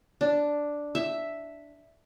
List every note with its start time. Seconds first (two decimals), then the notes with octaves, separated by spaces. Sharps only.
0.21 D4
0.95 E5